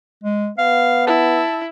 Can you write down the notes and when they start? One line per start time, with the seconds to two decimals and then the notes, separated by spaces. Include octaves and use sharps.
0.23 G#3
0.58 B3 F5
1.07 E4 A5